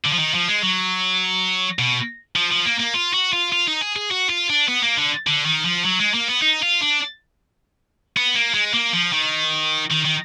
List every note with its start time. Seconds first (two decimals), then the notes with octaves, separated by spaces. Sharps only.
0.05 D3
0.12 F3
0.19 D#3
0.34 F3
0.48 G#3
0.62 F#3
1.79 B2
2.36 F3
2.52 F3
2.66 A#3
2.80 A#3
2.94 F4
3.13 F#4
3.33 F4
3.52 F4
3.67 D#4
3.81 G#4
3.96 G#4
4.11 F#4
4.29 F4
4.49 D4
4.68 B3
4.82 A#3
4.98 D3
5.27 D3
5.46 D#3
5.65 F3
5.85 F#3
5.99 G#3
6.14 A#3
6.28 B3
6.42 D#4
6.62 F4
6.81 D4
8.17 B3
8.35 A#3
8.54 G#3
8.74 A#3
8.93 F3
9.13 D#3
9.90 D#3
10.05 D#3